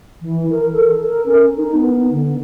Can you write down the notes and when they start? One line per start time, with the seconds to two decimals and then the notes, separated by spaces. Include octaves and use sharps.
0.21 E3
0.50 A#4
0.72 A4
1.05 A#4
1.25 C#4
1.56 D#4
1.75 B3
2.09 D3